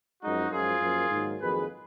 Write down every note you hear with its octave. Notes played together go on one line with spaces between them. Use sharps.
F#2 F3 G#3 D#4 F#4
F#2 F3 G#3 F4 G#4
F#2 F3 A#3
G#2 D#3 F#3 A#3
F2 D#3 F#3 A#3 G#4 B4